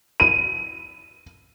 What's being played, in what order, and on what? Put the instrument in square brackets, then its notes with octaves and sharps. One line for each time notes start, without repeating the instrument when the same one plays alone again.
[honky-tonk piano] D#7